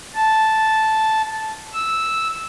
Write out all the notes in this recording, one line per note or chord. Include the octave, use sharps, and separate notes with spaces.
A5
E6